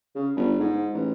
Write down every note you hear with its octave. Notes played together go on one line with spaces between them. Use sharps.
C#3
G1
G#2
A1